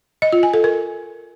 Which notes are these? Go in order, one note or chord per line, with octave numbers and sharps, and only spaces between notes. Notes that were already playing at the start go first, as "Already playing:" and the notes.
D#5
F4
G#5
A4
A#4